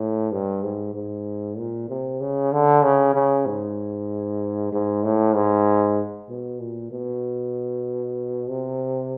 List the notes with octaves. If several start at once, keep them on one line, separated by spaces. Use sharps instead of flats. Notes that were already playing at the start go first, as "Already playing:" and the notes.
Already playing: A2
G2
G#2
G#2
A#2
C3
C#3
D3
C#3
C#3
G#2
G#2
A2
G#2
B2
A#2
B2
C3